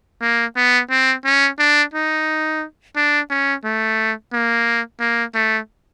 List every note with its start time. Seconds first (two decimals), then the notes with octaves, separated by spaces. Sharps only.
0.22 A#3
0.56 B3
0.90 C4
1.25 C#4
1.59 D4
1.94 D#4
2.96 D4
3.30 C#4
3.64 A3
4.33 A#3
5.00 A#3
5.35 A3